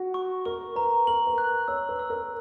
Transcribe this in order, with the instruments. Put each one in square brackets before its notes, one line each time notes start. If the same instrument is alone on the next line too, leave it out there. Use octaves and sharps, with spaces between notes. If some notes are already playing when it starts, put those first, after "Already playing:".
Already playing: [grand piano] F#4
[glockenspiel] C#6
[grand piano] A#4 [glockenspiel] C#6
[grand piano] B4 [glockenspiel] A#5
[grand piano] A#4 [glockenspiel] F#7
[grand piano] B4
[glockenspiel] F#6
[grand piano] C#5 [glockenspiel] E6
[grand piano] B4
[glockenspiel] E6
[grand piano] A#4